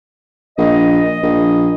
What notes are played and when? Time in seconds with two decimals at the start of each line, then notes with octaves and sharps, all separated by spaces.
0.58 A#1 D#5
1.23 A#1